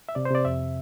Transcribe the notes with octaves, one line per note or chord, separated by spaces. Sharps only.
E5
C3 D5
C5
C3 D5
F2 E5